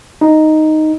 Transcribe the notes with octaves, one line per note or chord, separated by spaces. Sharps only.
D#4